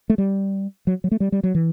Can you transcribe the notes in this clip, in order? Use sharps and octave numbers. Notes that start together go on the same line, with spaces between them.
A3
G3
F#3
F#3
A3
G3
G3
F#3
E3